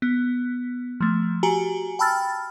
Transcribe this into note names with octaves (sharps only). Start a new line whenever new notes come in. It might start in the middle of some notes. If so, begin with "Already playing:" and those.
B3
F3 A3
F#4 G4 G#5 A#5
G5 A5 B5 E6 F6 A6